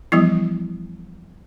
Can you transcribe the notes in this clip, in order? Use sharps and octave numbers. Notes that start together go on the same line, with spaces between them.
E3 F3 G3 B3 E4